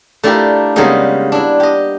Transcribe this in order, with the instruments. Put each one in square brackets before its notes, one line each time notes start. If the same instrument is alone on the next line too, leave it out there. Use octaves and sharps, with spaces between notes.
[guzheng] A3 D4 E4 F4 G4 A#4
C#3 G3 G#3 A#3 B3 D#4
D4 E4
G4 D#5